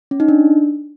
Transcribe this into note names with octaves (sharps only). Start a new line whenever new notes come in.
C#4
D#4
D4